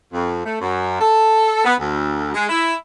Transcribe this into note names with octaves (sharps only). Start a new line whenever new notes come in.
F2
A3
F#2
A4
B3
D2
G#3
E4